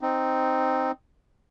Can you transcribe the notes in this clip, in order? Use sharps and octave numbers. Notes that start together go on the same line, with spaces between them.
C4 D#4